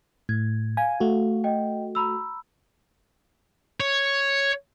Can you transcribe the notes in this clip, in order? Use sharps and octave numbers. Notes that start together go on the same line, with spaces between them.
A2 G#6
F5 G#5
A3 F#4
D#5 G5
A#5 B5 E6
C#5